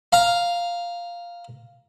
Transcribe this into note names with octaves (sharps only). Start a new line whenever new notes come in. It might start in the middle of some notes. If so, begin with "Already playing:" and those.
F5 A#5